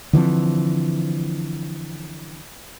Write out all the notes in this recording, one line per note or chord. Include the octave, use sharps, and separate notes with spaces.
D3 E3 F3 C4